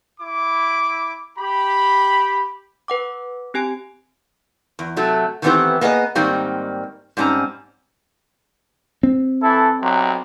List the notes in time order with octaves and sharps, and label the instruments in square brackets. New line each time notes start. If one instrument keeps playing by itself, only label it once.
[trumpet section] E4 D6
G4 B5
[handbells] B4 F#5 D6
C4 G4 G#5 D7
[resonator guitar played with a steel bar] E2
C3 F#3 A3
D#3 E3 A3 B3 C4 G4
A#3 B3 G#4 D5 D#5
G#2 D#3 G3 A#3 C4
G#2 G3 C4 C#4 A#5
[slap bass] C4
[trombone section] E3 E4 A4
B1 C3 F#3